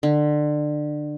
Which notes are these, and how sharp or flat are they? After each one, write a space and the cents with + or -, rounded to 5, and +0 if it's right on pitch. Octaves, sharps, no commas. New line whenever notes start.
D3 +25